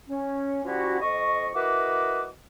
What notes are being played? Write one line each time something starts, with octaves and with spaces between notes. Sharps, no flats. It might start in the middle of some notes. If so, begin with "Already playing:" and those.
C#4
F3 G3 C#4 E4 F#4
F2 D#5 C#6
E4 F#4 A#4 B4 D#5 D6